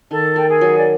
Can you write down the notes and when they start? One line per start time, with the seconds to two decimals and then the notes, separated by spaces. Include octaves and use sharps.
0.11 D#3 A4 A5
0.36 A#3 G5
0.48 G#4 G#5
0.61 F#3
0.78 D5